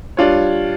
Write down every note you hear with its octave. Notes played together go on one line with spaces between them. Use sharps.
G3 D4 F4 C#5